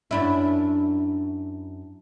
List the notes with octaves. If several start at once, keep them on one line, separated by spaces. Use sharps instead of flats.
F#2 D4 E4